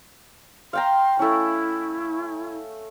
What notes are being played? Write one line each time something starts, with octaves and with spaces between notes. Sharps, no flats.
F5 G5 A#5 C6
A3 C#4 E4